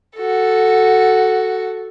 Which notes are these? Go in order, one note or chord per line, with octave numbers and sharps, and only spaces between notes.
F#4 A4